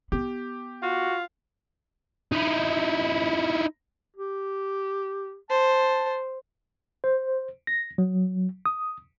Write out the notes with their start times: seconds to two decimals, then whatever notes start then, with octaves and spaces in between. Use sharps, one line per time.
0.12 B3 G4
0.82 F4 F#4
2.32 D#4 E4
4.16 G4
5.50 C5 A5
7.04 C5
7.67 A#6
7.98 F#3
8.66 D#6